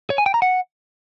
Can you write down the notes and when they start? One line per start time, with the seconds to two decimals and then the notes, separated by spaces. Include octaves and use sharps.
0.10 C#5
0.18 G#5
0.26 G5
0.34 A#5
0.42 F#5